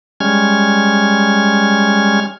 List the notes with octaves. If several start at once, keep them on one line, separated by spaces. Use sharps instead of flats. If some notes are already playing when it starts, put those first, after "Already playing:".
G3 G#3 C#4 F6 G#6